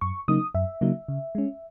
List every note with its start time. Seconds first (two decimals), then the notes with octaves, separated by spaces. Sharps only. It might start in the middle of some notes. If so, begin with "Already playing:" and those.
0.01 F#2 C#6
0.28 C#3 F#3 A#3 D#4 D#6
0.54 F#2 E5
0.81 C#3 F#3 A#3 D#4
1.08 C#3
1.35 G#3 C#4